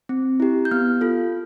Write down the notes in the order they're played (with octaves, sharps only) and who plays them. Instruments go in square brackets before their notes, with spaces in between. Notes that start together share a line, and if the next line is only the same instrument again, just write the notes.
[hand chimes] C4
E4 G4
G6
B3 F6
F4 A4